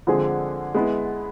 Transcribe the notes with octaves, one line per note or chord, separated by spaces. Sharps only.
D3 F3 G#3 C4 G#4
G#3 B3 E4